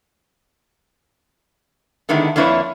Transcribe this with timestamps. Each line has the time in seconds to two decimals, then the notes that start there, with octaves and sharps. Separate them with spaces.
2.09 D3 D#3 G#3 A3 B3 E4
2.36 F2 A#3 D4 E4 B4 C#5